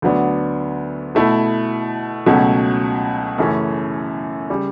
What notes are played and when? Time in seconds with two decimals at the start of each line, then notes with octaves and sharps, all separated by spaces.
0.02 D2 D3 F#3 B3 D4
1.15 B2 A3 E4
2.26 C#2 B2 F#3 A3 C#4
3.38 F#2 C#3 E3 A3 C#4
4.50 C#3 G3